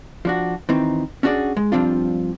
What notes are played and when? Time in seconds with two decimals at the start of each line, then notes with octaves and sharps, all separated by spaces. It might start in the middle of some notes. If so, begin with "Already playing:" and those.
0.25 F3 D4 F#4
0.69 D#3 E3 C4 D#4
1.23 C#4 D4 F#4 G#4 D5
1.57 G#3
1.72 G2 C3 F3 C4 D4 F4